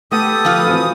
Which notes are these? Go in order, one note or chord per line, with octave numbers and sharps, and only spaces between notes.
A3 B3 G4 A4 F#5 D#6
F3 F4 B4
E3 C4 F#4